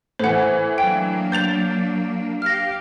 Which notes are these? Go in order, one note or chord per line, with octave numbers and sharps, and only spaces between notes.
A2 E3 C5 F#5
F#3 A#3 D4 G5
G6 A6 F7
G4 F5 F6 A#6